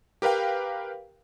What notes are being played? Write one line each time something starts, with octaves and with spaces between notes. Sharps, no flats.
G4 A#4 B4 F5 G5